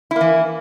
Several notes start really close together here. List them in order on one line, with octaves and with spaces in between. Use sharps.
E4 A#3 E3